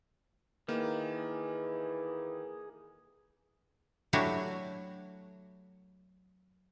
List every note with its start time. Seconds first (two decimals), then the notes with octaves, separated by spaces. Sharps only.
0.69 D#3 E3 A#3 G#4
4.13 F#3 A3 D4 E4 F#4 G4